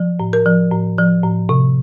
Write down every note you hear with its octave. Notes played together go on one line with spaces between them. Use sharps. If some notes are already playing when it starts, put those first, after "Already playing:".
Already playing: F3
A2
A#4
F3
A2
F3
A2
C3